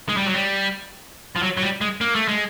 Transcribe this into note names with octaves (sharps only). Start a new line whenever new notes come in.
G#3
G3
F#3
G3
F3
F#3
F#3
G3
G#3
A#3
A3
G#3